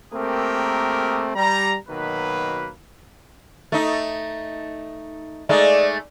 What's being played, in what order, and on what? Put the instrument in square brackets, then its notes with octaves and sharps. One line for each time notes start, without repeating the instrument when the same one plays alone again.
[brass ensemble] A3 A#3 C4 G4 G#4 A#4
G3 A#5
B2 D#3 F#3 A#3 B4
[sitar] A3 D#4
[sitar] G#3 A3 D#4 [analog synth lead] D5